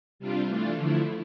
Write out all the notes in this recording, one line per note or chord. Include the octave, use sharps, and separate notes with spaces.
C3 G3 D4 F4
E3 A3 D4 F4
D3 F3 A3 E4